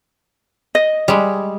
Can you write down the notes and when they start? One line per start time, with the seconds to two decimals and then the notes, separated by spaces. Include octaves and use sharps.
0.75 D#5
1.08 G3 G#3